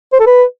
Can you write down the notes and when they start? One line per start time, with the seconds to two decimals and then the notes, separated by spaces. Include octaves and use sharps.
0.13 C5
0.20 A4
0.27 B4